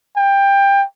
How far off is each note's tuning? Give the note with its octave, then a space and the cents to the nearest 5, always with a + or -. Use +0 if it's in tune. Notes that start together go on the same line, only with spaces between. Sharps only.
G5 +20